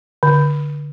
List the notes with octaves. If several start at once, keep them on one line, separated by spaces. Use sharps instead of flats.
D3